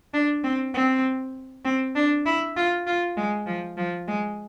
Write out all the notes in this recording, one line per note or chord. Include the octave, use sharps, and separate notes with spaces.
D4
C4
C4
C4
D4
E4
F4
F4
G#3
F3
F3
G#3